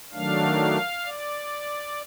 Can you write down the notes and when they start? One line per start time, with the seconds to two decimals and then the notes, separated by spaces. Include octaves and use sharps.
0.13 D#3 F#3 A3 D4 F5
1.05 D5